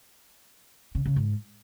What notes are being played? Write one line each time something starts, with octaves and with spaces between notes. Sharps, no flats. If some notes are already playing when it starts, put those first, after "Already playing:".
C#3
C#3
G#2